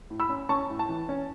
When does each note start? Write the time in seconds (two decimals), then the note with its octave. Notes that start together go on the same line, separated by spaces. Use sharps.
0.10 A2
0.20 B5 E6
0.29 C#4
0.49 C#4 A5 C#6
0.70 A2
0.79 A5
0.89 E3
1.09 C#4